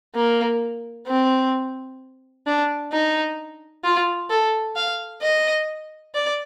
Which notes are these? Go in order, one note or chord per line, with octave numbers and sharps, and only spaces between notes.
A#3
C4
D4
D#4
F4
A4
F5
D#5
D5